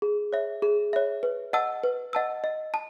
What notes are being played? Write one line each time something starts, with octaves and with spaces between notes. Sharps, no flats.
G#4
C#5 E5
G#4
C#5 E5
B4
D#5 F#5 A5 E6
B4
D#5 F#5 A5 E6
D#5
A5